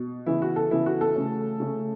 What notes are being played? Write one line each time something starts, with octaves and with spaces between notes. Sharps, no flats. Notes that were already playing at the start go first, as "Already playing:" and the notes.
Already playing: B2
C#3 E3 B3 E4
F#4
A4
C#3 E3 B3 E4
F#4
A4
C#3 A3 C#4
C#3 A3 C#4